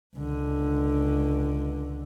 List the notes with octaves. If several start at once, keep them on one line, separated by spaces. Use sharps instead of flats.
C#2 D3